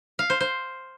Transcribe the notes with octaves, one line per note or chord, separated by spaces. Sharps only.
F5
C5
C5